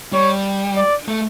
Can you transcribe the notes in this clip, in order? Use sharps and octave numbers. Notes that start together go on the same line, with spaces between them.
G3 C#5
D5
A3